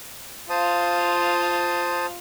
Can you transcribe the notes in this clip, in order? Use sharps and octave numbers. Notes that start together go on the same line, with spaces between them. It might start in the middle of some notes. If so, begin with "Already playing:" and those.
F4 C5 F5 A5 D#6